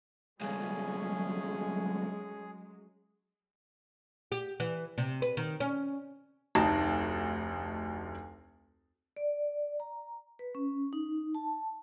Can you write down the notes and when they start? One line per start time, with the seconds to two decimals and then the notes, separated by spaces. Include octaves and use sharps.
0.41 C#2 G2 F#3 G#3 A3 C#4 G#4
4.32 G4
4.60 E3
4.98 C3
5.22 B4
5.37 D#3
5.60 C#4
6.55 F1 D2 D#4 A5 A#5
9.16 D5
9.80 A#5
10.39 B4
10.55 C#4
10.93 D#4
11.35 A5